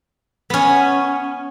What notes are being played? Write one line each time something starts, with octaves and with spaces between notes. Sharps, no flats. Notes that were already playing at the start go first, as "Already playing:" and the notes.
B3 C#4